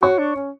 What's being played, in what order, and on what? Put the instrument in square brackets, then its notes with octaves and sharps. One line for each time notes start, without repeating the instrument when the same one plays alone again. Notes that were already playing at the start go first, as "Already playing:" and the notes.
[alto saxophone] F#4 [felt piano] C#5 C#6
[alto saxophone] D4
C#4